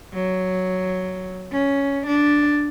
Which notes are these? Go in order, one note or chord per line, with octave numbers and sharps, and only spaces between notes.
F#3
C#4
D4